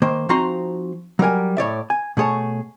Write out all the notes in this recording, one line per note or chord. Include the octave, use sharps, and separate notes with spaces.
D#3 A#3 C5
F3 C4 D#4 F#4 A#5 C6
F#3 G3 A#4 G#5
A2 C#5 D5 E5
G#5
B2 A3 G#4 C#5 A5